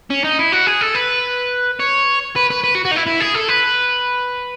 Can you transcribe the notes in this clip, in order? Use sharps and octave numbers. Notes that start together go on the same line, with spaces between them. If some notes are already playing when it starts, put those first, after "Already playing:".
C#4
D#4
E4
F#4
G#4
A4
B4
C#5
B4
B4
B4
F#4
F#4
D#4
E4
E4
G#4
A4
B4